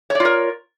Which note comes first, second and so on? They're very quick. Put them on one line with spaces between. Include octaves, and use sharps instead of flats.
C#5 D5 F4 A#4